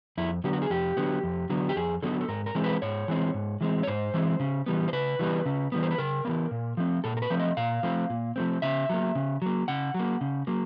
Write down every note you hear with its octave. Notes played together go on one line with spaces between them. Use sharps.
F2 E4
D3 F#3 B3 G4
F#4
G#4
F2 G4
D3 F#3 B3
F2
D3 F#3 B3
G4
F2 G#4
D3 F#3 B3 A4
A4
G#2 A#4
A#4
E3 G#3 C4
B4
G#2 C#5
E3 G#3 C4
G#2
E3 G#3 C4
C#5
G#2 C5
E3 G#3 C4
C#3
E3 G3 B3
C5
C#3 B4
E3 G3 B3
C#3
E3 G3 B3
C5
B4
C#3 A#4
E3 G3 B3
A#2
F3 A3 C4
A#2 A4
A#4
B4
F3 A3 C4
D#5
A#2 F5
F3 A3 C4
A#2
F3 A3 C4
C#3 E5
F#3 A#3
C#3
F#3 A#3
C#3 F#5
F#3 A#3
C#3
F#3 A#3